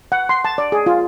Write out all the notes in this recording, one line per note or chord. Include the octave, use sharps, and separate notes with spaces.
F#5
C6
A5
D5
G#4
F4